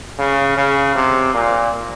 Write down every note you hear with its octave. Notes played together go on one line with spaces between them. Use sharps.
C#3
C#3
C3
A#2